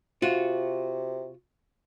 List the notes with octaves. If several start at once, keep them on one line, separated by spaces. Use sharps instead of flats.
C3 F4 F#4